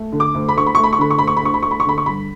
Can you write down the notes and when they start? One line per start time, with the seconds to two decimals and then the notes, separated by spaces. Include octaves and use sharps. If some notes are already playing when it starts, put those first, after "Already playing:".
Already playing: A3
0.13 D3
0.20 D6
0.34 D2
0.49 B5
0.56 D2 C#6
0.66 B5
0.75 A3 C#6
0.84 B5
0.93 C#6
0.99 D3 B5
1.10 C#6
1.18 D2 B5
1.27 C#6
1.37 B5
1.42 D2 C#6
1.54 B5
1.63 A3 C#6
1.71 B5
1.80 C#6
1.85 D3 B5
1.98 C#6
2.06 G2 B5